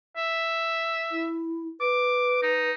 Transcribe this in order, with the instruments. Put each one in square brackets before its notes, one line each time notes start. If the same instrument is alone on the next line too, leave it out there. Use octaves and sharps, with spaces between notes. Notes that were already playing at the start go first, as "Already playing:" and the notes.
[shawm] E5
[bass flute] E4
[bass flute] B4 [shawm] D6
[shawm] D#4